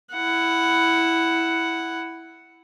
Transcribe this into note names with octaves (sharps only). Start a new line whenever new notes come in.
E4 F#5